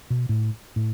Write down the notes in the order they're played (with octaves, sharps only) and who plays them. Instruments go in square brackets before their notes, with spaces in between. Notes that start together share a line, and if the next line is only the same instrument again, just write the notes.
[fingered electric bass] B2
A2
A2